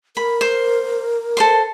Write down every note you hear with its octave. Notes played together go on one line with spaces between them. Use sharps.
A#4 B5
C5
A4 C5 C6